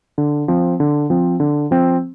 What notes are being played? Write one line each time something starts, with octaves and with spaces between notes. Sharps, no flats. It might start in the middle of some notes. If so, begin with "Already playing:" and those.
D3
F3 C4
D3
F3 C4
D3
F3 C4